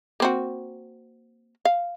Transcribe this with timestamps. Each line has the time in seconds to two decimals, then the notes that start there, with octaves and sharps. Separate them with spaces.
0.20 A#3 C4 F#4
1.65 F5